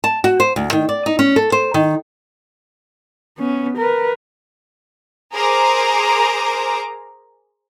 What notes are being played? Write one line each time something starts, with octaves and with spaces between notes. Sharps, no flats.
A5
F#4
C5
D2
D#3
D5
D#4
C#4
A4
C5
D#3
B3 C#4
A#4 B4
G#4 A#4 C5 A#5 D6